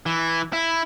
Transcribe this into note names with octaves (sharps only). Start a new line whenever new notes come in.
E3
E4